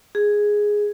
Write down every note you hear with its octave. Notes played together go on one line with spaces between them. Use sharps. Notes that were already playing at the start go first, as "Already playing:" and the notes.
G#4